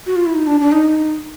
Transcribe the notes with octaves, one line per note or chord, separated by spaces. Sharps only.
F#4
F4
E4
D#4
D4
D4
D#4